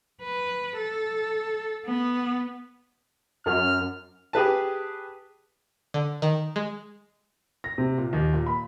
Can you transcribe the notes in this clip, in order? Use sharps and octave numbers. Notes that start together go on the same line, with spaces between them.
B4
A4
B3
F#2 F6
G4 G#4 B4 A5
D3
D#3
G#3
A#6
C3
A#2
D#2
A#2
B5